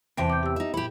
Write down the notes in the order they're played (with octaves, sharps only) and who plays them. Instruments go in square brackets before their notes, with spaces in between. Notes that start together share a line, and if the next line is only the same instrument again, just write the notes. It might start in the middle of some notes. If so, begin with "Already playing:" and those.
[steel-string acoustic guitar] E2 C3 G5 [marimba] C5 A5
[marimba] D6 G6
G4 E6
[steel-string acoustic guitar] D#4 E5
[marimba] A#2 [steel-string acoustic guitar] E4 G4